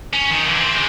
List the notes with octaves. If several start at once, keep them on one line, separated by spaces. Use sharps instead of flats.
C#4
D#3
D3 E3
C4 C5
C#3 G#3